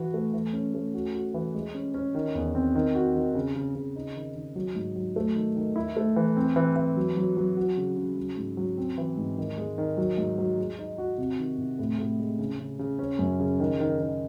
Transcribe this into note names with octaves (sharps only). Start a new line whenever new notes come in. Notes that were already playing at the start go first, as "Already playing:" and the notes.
Already playing: E3 F#4
A3
E3
C#4
A3
F#4
F#4
E3
G#3
C#4
C#4
D#3
E2
C4
D#3
F#4
D#3
C#3
C#3
C#3
D#4
D#3
D#3
F#3
G#2
F#3
A3
D#3
D#3
E4
A3
E3
C4
E3
E3
F#3
F#3
F#3
F#4
C#3
C#3
F#3
G#2
F#3
C4
E3
G#2
D#3
G#3
D#3
F#3
G#2
F#3
G#3
D#4
F#4
C3
D#3
C3
A2
A2
G#3
C#3
C#3
C#3
C#4
F#2
C#3
D#3
D#3
D#3